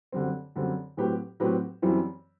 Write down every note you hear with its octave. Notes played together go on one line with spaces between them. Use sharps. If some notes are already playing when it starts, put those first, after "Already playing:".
F#2 D3 G3 C4
F#2 D3 G3 C4
A2 F#3 C4 G4 B4
A2 F#3 C4 G4 B4
F#2 E3 G3 C4 E4